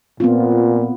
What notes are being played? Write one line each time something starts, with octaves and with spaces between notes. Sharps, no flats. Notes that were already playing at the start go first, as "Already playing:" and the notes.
A#2 B3 C4 F4